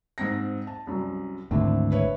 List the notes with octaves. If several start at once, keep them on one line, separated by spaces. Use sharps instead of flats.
G#2 C4 A#6
A5
C2 F#2
G#1 D2 C4 D4 E4
B4 C#5 E5